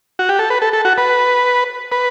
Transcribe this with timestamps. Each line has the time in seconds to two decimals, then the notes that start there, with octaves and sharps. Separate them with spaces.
0.19 F#4
0.29 G4
0.39 A4
0.50 B4
0.62 A4
0.73 A4
0.85 F#4
0.98 B4
1.92 B4